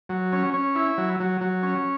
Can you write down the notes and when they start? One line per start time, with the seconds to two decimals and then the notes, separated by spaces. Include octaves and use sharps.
0.09 F#3
0.32 C#4
0.54 C#4
0.76 E4
0.98 F#3
1.20 F#3
1.41 F#3
1.63 C#4